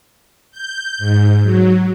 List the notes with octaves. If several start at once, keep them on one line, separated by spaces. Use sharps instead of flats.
G6
G#2
F#3